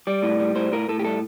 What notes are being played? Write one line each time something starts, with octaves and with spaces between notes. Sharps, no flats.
G3 D5
A2
G3
A2 C5
A2 A#4
A2 A4
G4
G3 A4